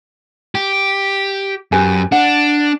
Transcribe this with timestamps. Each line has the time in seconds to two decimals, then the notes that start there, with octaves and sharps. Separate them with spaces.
0.55 G4
1.72 F#2 G4 B4 G#5
2.12 D4 F#5